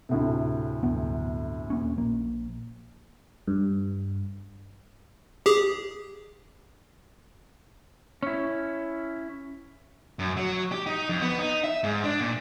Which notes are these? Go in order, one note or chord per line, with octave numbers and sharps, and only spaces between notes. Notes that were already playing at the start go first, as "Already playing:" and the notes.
D2 A2 C3
D1 G2 B3
D#1 A#3 C#4
A#1 A#3
G2
G4 G#4
C#4 E4
F#2
F#3
G4
D#4
F2
B3
D#4
E5
G#2
D4
A#2